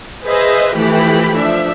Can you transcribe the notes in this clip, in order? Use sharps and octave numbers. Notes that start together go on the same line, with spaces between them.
G#4 B4 C5 D#5 E5
E3 F3 A3 G4 B5
F3 D4 E5